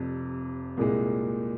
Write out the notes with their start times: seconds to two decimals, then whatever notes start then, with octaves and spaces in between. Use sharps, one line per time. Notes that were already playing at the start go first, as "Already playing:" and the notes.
Already playing: F1 F2 C3
0.77 C2 A#2 G#3